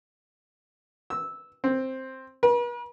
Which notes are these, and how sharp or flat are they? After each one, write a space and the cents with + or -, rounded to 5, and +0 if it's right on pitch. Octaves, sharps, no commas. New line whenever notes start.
E6 -10
C4 +5
B4 -45